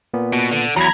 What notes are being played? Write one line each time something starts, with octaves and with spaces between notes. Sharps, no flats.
A#2 B3
B2
D3
E2 F#3 A#5 B5 G#6